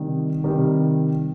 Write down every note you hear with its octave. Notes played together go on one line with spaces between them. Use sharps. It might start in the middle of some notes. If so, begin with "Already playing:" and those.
Already playing: C3 D#3 G3
C3 D#3 G3